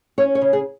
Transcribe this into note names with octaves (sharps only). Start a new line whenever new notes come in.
C#4 C#5
C#5
C#3
G#4